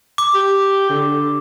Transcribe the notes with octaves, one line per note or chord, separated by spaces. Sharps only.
D6
G4
D3